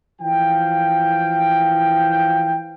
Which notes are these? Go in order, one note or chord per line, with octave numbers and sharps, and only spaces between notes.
E3 F3 F5 G5